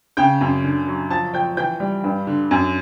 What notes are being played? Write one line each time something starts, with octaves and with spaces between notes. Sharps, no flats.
C#3 G5 G6
F#2
D3
F#3
F3 A5 A6
F3 G5 G6
E3 G5 G6
G3
G2
D3
F#2